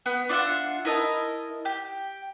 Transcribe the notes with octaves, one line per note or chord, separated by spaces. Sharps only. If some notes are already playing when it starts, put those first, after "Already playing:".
B3
D4 F4 E5 F#5
E4 A#4 D#5 A5
G4